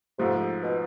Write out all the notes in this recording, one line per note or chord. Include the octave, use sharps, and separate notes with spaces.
G#2 C3 F3 A3
B2